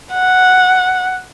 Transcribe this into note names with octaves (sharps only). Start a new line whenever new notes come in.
F#5